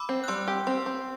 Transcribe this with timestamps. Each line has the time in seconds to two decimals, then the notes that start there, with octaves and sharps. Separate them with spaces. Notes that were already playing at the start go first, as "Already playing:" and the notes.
Already playing: B5 D6 E6
0.09 C4
0.24 F#6
0.28 G3 C6 E6
0.48 G4
0.67 C4 C6 E6
0.86 C4